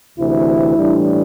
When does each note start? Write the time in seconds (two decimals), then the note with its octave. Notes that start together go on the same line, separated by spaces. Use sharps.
0.18 D2 C3 E3 E4
0.77 A2 E3 G3 D4